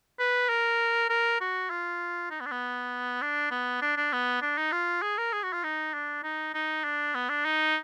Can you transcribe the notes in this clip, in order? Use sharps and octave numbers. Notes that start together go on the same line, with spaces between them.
B4
A#4
A#4
F#4
F4
D#4
B3
D4
B3
D4
B3
D4
D4
B3
D4
D#4
F4
G#4
A#4
G#4
F#4
F4
D#4
D4
D#4
D#4
D4
B3
D4
D#4